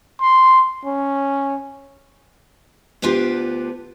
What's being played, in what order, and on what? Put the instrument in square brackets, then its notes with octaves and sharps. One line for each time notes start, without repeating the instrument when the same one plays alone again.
[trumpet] C6
C#4
[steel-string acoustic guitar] D2 B3 D4 F4 G4